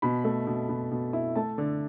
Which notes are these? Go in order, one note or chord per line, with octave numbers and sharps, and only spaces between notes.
B2 B5
A3
B2
B2
B2
E4
A3 A5
D3